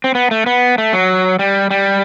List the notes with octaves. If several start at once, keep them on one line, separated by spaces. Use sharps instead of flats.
C4
B3
A3
B3
A3
F#3
G3
G3